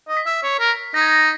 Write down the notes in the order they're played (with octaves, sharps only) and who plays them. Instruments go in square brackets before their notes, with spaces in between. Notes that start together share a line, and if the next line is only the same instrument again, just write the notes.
[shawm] D#5
[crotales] B6
[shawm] E5
C#5
A#4
[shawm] D#4 [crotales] A#6
[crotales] G#6
A#6